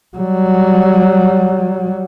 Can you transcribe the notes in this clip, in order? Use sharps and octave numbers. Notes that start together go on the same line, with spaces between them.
F#3 G3